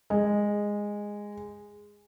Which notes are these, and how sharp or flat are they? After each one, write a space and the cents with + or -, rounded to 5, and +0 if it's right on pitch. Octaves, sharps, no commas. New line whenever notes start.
G#3 -10